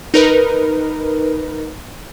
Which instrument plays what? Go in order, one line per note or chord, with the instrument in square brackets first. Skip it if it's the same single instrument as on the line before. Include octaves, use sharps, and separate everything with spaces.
[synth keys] D#4 A#4 B4